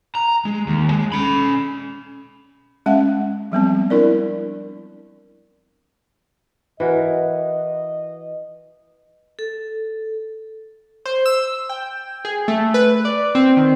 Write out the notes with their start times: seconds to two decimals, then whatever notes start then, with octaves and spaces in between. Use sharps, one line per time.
0.15 A#5
0.45 G#3
0.67 D#2
0.91 G#3
1.12 C#4 B5
2.86 G#3 C#4 E5 F#5
3.52 F3 G3 B3 C4
3.90 D4 E4 A#4 D5
6.80 E3 F#4 A#4 D#5
9.39 A4
11.06 C5
11.26 E6
11.69 G5
12.25 G#4
12.48 A3
12.74 B4
13.05 D5
13.35 C4
13.57 D#3